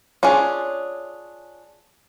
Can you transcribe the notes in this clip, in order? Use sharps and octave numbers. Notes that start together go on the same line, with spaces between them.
C#4 D4 F4 G#4